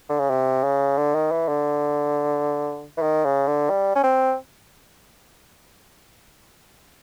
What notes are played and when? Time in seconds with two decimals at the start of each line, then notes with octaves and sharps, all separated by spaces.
0.09 D3
0.19 C#3
0.30 C3
0.64 C#3
0.97 D3
1.15 D#3
1.31 E3
1.48 D3
2.97 E3
3.02 D#3
3.25 C#3
3.47 D3
3.70 G3
3.95 C#4
4.04 C4